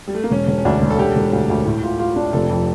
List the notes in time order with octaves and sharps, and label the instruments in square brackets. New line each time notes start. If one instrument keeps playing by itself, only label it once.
[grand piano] G3
A3
A#3
[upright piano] E1 [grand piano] C#4
[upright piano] E1
[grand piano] C#4
[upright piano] D2 [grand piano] D4
[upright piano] E1
[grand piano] A4
[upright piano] E1 [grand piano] G4
[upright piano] E1
D2
D2
A2
F4
F4
D4
[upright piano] F1 [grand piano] A4
[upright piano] F2